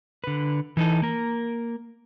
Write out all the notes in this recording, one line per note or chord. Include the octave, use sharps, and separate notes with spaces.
D3 B4
E3 D#4 A4
A#3 A#4